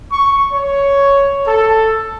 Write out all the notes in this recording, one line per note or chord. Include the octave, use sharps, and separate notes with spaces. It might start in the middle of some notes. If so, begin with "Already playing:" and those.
C#6
C#5
A4